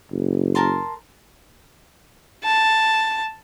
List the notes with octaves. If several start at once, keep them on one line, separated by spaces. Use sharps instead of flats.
F#1
A#4 A5 C6
A5